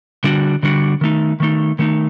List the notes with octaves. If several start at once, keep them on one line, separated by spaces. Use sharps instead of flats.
D3 G3 D4 F#4
D3 G3 D4 F#4
D#3 A3 D#4
D#3 A3 D#4
D#3 A3 D#4